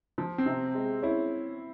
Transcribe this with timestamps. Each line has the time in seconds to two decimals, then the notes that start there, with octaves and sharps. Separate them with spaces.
0.18 F3
0.38 C4
0.46 C3
0.75 G#3
1.02 C#4 E4